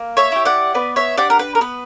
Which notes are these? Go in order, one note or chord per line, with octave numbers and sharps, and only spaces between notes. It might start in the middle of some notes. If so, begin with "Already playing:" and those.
Already playing: A#3
C#5 E5
E4 G4
D5 F#5
B3 B4 D5
C#5 E5
D4 G4 D5 F#5
A#4
B4
A#4
B3 B4